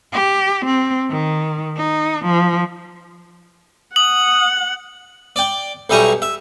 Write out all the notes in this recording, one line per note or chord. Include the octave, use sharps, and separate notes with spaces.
G4
C4
D#3
D#4
F3
F#5 D#6 F#7
D5 G5
B1 G3 E5 G#5 A#5 C#6
E5